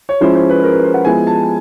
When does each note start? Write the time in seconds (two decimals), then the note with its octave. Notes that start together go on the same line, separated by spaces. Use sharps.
0.09 C#5
0.21 F3 G#3 C#4 E4 C5
0.35 C5
0.49 B4
0.63 A#4
0.73 B4
0.84 C5
0.94 F#5
1.05 F3 G#3 B3 E4 G#5
1.27 A5